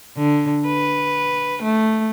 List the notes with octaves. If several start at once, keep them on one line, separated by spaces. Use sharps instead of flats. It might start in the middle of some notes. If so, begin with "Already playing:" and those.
D3
B4
A3